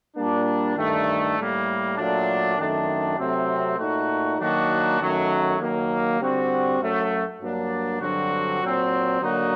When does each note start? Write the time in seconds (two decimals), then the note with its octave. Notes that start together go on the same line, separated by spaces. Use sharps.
0.16 A#2 G3 A#3 D4
0.76 G2 D#3 A3
1.38 A2 G3 A#3
1.97 A#2 F#3 A3 D4
2.58 F#2 D#3 A3 D4
3.19 C3 F#3 A3 C4
3.79 A#2 A3 D#4 F#4
4.39 D#3 F#3 A#3 D4 F#4
5.00 F#2 D#3 F#3 A3
5.60 D#3 F#3 A#3
6.20 D3 G3 C4 F#4
6.81 F#2 F#3 A3
7.41 G2 F#3 A#3 D4
8.01 G2 D3 F#3 C4 F#4
8.62 A#2 F#3 C4
9.22 D3 F#3 A#3 D#4 F#4